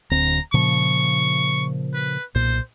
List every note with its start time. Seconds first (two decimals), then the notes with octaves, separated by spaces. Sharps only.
0.11 D1 D2 C4 A#5
0.54 A#2 C#3 F3 C#6
1.94 B4
2.35 B1 A#2 C5